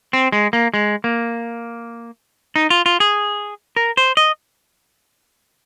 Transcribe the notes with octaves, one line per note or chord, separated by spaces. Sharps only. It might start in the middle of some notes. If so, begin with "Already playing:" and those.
C4
G#3
A#3
G#3
A#3
D#4
F4
F4
G#4
A#4
C5
D#5